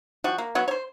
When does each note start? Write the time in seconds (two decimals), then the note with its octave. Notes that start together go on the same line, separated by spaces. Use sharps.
0.24 F3 G3 F#4
0.38 A#3
0.55 F#3 B3 F#4
0.68 C5 C#5